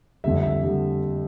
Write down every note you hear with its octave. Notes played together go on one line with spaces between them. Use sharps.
F2 D3 G3 E5
E5
D3 G3